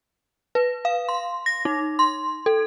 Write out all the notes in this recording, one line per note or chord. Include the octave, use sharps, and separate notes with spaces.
B4
F5
C6
A#6
D#4
C6
A4